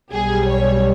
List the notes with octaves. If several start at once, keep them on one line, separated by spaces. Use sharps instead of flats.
B1 B2 G3 G#4
C#5